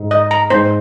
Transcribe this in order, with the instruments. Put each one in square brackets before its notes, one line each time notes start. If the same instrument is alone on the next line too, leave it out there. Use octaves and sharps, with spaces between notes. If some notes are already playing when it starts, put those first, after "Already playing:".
Already playing: [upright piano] G#2
[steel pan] D#5
A#5
[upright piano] G#2 [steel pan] C5